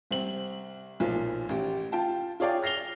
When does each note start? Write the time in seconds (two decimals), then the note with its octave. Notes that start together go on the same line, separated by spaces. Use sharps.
0.11 C2 C4 F#7
1.00 B1 A#2 F3
1.49 A1 G4
1.92 F4 G5 A5
2.40 F4 G#4 C#5 D5 F5 G5
2.62 F6 A#6 C7 F7 G7